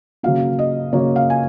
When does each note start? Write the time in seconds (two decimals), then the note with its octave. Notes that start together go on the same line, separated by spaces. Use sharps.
0.23 C#3 F#3 A#3 F5
0.59 D#5
0.93 C#3 F#3 A#3 C#5
1.16 F5
1.30 G#5